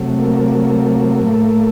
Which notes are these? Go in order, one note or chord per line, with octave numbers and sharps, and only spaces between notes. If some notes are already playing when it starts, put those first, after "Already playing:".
Already playing: C3 F#3 A3
A#3
A2 A3